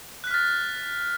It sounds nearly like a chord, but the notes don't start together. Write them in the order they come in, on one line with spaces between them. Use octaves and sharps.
F#6 B6 F6 A6